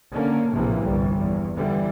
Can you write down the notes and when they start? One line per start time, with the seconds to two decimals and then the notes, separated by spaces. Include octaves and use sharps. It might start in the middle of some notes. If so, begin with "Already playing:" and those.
0.12 D3 A#3 C#4
0.53 A#1 A2 C3 E3 F3 A#3
0.82 G1 C2 G3
1.20 E2
1.56 D3 E3 G3